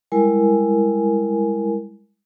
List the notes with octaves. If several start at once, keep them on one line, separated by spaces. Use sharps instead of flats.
G3 G#3 E4 A#4 G#5